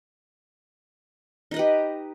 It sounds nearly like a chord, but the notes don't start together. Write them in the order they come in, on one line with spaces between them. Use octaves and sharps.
D#4 D#5 B4 G4